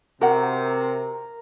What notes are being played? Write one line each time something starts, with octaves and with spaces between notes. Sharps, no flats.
C3 F#4 A#4 F#5